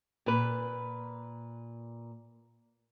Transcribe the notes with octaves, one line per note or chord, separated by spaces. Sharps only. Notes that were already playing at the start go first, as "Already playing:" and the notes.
A#2 B4